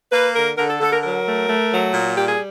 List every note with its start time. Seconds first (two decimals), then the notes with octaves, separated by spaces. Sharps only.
0.12 A#3 B4
0.35 D3 A#4
0.57 D3 A#4
0.69 A4
0.80 D3 A4
0.92 A#4
1.03 F#3 A#4
1.26 A3
1.48 A3
1.71 F#3
1.93 A#2
2.16 G3 G4
2.28 G#4